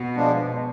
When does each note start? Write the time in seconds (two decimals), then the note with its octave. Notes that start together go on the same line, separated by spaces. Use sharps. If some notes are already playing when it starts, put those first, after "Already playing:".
Already playing: B2
0.16 F3 G#3 D4